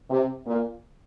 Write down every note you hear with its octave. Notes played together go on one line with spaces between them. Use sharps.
C3
A#2